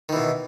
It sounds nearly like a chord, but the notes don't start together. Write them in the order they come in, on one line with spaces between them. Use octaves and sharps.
D#3 E3 B2